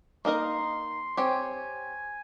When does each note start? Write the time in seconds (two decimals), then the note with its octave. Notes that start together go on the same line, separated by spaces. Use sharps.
0.25 A#3 D#4 A#4 D#5 C6
1.17 C4 G4 C#5 G#5